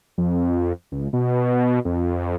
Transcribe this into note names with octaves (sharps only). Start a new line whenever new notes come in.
F2
C#2
B2
F2